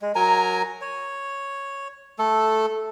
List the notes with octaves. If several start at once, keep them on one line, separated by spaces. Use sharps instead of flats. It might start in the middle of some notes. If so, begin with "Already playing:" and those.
G#3
F#3 A#4 G#5 A#5
C#5
A3 A4